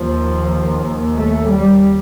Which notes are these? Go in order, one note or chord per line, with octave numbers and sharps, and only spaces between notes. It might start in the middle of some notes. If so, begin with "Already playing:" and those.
Already playing: D#2 F3
A3
G3